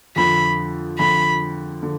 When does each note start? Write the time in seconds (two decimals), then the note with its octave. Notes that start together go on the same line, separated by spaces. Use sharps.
0.16 F2 D3 F3 B5
0.99 F2 D3 F3 B5
1.83 D3